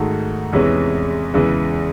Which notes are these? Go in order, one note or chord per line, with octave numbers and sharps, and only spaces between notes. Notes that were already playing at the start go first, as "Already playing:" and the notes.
Already playing: G#2 D#3 A3 D#4 F#4
E2 C3 E3 G#3 C#4
E2 C#3 E3 G#3